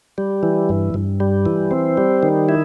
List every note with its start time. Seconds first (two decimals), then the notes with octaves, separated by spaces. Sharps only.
0.18 G3
0.43 E3
0.69 G2
0.94 G2
1.20 G3
1.46 E3
1.71 C4
1.97 G3
2.23 D#3
2.49 E4